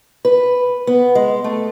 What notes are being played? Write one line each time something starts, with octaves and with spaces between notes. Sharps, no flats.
B4
B3
G#3
A3